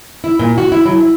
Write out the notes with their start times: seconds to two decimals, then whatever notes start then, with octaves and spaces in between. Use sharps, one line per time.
0.24 E4
0.39 A#2
0.58 F#4
0.72 E4
0.85 F#3
1.00 E4